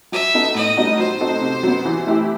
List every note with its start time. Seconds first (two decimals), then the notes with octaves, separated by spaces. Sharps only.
0.12 F#3 E5
0.34 B3 D#4 A4
0.55 A2 D#5
0.77 G3 B3 D#4 F#4
0.99 F#3 C5
1.20 C4 D#4 F#4 A4
1.41 C3
1.63 F#3 B3
1.85 E3
2.07 A3 E4 G4